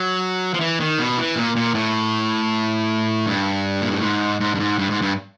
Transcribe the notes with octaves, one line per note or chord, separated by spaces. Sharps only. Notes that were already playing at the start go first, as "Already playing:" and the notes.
Already playing: F#3
F3
E3
D#3
B2
E3
A#2
A#2
A2
G2
A#2
A2
G#2
G#2
G2
G#2
G2
G#2
G2